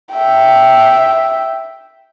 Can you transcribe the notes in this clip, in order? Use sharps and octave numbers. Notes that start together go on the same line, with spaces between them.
E5 G5